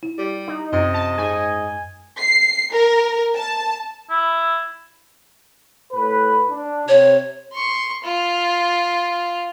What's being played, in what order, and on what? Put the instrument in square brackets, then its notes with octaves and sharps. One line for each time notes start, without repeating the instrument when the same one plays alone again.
[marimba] E4
[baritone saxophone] G3
[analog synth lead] D#4
[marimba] F#2 C#4 [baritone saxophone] C3 [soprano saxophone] D#5
[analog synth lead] A5
[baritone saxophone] G#2 [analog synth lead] G#5
[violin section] C7
A#4
A5
[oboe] E4
[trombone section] A2 B4
D4
[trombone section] C3 [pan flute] C#5
[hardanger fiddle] C6 C#6
F4